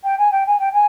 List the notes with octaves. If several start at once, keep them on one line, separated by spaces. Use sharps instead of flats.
G5
G#5
G5
G#5
G5
G#5